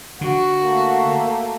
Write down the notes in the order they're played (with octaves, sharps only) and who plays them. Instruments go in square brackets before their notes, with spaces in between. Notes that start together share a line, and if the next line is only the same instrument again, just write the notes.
[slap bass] D3 [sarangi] F#4
[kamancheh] A3 A#3